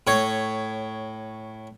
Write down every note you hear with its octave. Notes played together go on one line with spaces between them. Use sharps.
A2 C#5